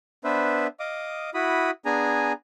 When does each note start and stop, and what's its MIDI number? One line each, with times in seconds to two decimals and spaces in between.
0.24 0.67 59
0.24 0.67 62
0.24 0.67 71
0.24 0.67 72
0.24 0.67 76
0.80 1.30 75
0.80 1.30 77
0.80 1.30 86
0.80 1.30 87
1.34 1.71 64
1.34 1.71 66
1.34 1.71 83
1.34 1.71 87
1.85 2.33 59
1.85 2.33 62
1.85 2.33 68
1.85 2.33 80
1.85 2.33 82